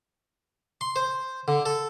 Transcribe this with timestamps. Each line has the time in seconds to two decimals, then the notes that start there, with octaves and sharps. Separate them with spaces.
0.81 C6
0.96 C5
1.48 D3
1.66 A4